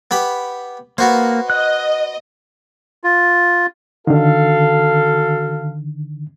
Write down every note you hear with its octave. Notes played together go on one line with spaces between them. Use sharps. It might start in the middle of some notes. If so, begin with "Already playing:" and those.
B3 G4 B5
A#3 B3 F#4 C5
D#5 F#6
F4
D3 D#3 F#4 A4 F5